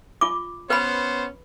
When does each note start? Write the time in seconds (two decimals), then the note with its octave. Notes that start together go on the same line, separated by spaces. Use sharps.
0.21 F4 D6
0.70 B3 C#4 B4 C5 B5